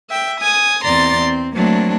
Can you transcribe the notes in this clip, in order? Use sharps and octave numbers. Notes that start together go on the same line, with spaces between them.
E5 G5
G#5 D#6
E2 C4 D5 A#5 C6 A6
C4
F#3 A3 A#3 C4 D4